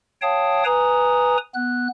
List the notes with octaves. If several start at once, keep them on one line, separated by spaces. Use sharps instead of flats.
C#5 F5 G5 A5 D#6
B4 G#5 A#5 D#6
B3 F#6